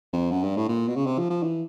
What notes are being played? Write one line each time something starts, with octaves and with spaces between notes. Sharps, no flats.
F2
F#2
G2
A2
A#2
B2
C#3
C3
F3
F3
E3